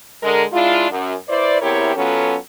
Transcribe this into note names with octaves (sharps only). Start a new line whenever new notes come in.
D3 G#3 A#4
G#3 D4 E4 F4
F#2
E4 B4 C5 D5
E2 C4 E4 G4 A#4 C#5
F#3 B3 C#4 F4 A4